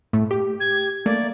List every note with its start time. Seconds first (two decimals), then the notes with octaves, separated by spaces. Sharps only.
0.13 A2 A3
0.31 G4
0.60 G#6
1.06 A3 A#3 D5